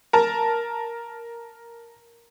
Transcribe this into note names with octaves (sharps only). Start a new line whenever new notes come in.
A#4 A5